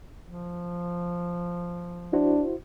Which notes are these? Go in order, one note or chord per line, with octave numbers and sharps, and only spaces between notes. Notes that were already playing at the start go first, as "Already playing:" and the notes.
F3
D4 E4 F#4 C5